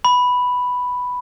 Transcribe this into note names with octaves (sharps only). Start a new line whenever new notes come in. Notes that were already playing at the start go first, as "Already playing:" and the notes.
B5